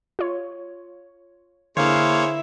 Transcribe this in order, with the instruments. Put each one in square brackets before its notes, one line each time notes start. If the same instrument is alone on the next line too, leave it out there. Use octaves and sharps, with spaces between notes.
[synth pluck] F4 C#5
[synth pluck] D3 [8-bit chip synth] A#3 C#5 [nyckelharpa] E4 E5 [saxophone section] G#4 C5 F5